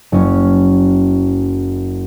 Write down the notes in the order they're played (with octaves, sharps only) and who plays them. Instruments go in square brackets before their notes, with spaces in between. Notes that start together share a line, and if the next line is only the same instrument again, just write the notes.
[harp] F#1 C#4